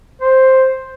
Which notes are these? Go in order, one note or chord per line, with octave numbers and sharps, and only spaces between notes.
C5